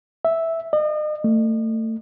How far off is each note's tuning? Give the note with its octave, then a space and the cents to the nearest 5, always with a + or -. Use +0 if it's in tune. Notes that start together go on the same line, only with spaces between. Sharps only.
E5 -5
D#5 -40
A3 +25